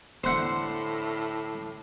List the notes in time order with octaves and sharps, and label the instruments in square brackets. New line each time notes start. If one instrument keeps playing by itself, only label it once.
[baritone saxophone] A2 [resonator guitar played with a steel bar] D3 C5 [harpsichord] F#5 C6